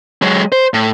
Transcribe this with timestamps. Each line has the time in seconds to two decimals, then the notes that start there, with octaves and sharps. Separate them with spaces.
0.22 F#3 G#3
0.52 C5
0.74 A2